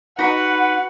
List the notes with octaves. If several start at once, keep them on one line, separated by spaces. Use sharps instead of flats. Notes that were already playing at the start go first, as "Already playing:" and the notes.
D#4 F#4 B4 F#5 B5